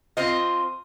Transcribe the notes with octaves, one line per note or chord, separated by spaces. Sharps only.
C4 F4 C5 D#5